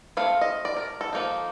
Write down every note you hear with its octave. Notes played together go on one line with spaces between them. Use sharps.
A3 C4 F5
D#5
D5
A#4
A4
F3 A#3 D#4